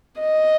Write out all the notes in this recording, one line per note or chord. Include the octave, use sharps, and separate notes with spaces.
D#5